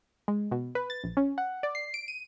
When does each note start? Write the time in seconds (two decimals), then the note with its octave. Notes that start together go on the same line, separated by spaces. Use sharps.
0.28 G#3
0.51 B2
0.75 B4
0.90 A6
1.04 A#1
1.17 C#4
1.38 F#5
1.63 D5
1.75 C7
1.94 D7
2.08 D#7